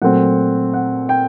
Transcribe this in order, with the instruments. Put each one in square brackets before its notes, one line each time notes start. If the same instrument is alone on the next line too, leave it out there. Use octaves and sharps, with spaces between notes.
[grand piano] A#2 F#3 A3 C4 F#5
F#5
G5